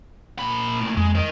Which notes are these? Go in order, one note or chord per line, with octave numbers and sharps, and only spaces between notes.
A#2 B5
A2 A#3
F2 G#3
A#4 D#5